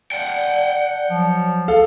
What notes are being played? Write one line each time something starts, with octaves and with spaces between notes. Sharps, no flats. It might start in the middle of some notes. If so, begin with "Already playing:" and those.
D5 F#5 G5
F3 F#3
G#4 A4 F5